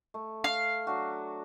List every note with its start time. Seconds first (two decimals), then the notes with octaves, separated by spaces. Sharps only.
0.14 A3
0.44 F5
0.87 F#3 D4 F#4